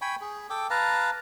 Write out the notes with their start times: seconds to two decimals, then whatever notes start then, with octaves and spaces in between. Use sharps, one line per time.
0.01 G5 G#5 B5 C#6
0.21 G#4
0.50 A4 G5 D6
0.70 B4 F5 A5 A#5